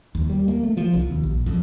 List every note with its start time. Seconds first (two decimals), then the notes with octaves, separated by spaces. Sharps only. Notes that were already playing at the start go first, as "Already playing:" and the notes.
0.15 D#2
0.30 G3
0.48 A#3
0.63 A3
0.77 F3
0.93 C2
1.10 D#2
1.23 A#1
1.46 F2